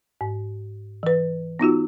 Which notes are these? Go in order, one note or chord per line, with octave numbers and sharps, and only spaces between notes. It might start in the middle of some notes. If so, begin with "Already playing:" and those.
G#2
E3 B4
B3 D#4 F4 F#4